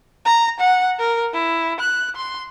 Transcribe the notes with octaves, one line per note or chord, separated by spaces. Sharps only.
A#5
F#5
A#4
E4
F#6
C6